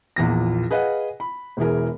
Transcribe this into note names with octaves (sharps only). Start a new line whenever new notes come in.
A#1 E2 A#2 A#6
G#4 B4 D#5 F5 F#5
B5
E1 E3 G#4 A#4